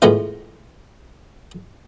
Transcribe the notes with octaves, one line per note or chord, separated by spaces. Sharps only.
A2 G#3 B3 C#4 F4 F5